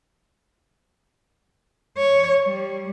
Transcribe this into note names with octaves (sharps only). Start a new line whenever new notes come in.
C#5
G3